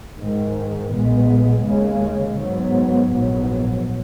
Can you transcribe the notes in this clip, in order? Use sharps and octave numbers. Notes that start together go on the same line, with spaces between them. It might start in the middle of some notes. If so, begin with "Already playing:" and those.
G#2 D#3 G#3
B1 A#2 G#3 B3
D#2 C#3 G#3
G#2 F#3 B3
A#1 G#2 F#3 B3